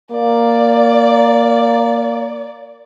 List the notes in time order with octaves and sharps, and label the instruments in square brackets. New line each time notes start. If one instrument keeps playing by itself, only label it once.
[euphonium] A#3 [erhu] D5